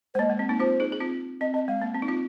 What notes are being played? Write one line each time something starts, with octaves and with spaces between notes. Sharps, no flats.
G#3 C5
A#3 D#5
G#3
C4
A#3 D#4
C4 F4 C5
D#4 G#4
G#4
C4 F4
C4 D#5
C4 D#5
G#3 F5
A#3
C4
D#4
C4 F4